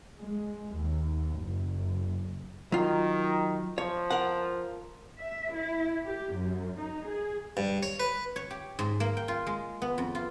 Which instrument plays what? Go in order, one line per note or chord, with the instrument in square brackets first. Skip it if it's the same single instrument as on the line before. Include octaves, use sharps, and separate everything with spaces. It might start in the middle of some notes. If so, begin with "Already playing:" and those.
[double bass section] G#3
D#2
F#1
[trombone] D#3 [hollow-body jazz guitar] F#3 F4
[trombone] F3 [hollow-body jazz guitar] C#5
[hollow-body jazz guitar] A#4 F#5
[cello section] E5
E4
G4
F#2
D#4
G#4
[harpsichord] G2
C#5
B4
[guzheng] C#5
G4
G#2
A#3
G5
F4
G#3
B3
F2
F4